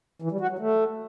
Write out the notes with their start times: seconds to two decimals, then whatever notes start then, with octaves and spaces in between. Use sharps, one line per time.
0.22 E3
0.31 G3
0.40 F#4
0.50 F#3
0.59 A3